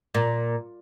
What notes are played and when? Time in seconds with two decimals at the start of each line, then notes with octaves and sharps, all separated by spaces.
0.15 A#2